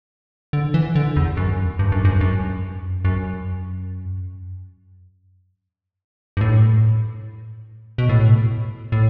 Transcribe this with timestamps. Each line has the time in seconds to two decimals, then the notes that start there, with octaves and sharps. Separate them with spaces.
0.53 D3
0.74 E3
0.95 D3
1.16 E2
1.37 F#2
1.79 G2
1.92 F#2
2.05 G2
2.21 F#2
3.05 F#2
6.37 G2
6.41 A2
7.98 B2
8.09 A2
8.92 A2